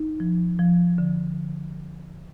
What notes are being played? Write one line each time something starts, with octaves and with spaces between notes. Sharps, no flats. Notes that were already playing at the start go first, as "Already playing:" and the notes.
Already playing: D#4
F3
F3
D3